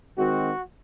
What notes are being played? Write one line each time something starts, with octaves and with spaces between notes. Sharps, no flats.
D#3 G#3 C4 F#4